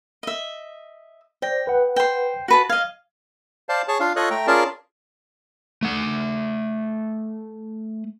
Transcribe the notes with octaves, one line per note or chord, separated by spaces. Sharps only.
D#5 E5
C5 D5 G5 A#6
B4 F#5
C5 G5
F#4 B4 A5
D#5 F5 G#6
C5 D5 F5 A5
G#4 C#5 A5
D4 F4 F5
F4 A4 C#5 D#5 D#6 F#6
A3 G5 A#5
C#4 F4 G#4 A#4 D5 A5
A3 F#5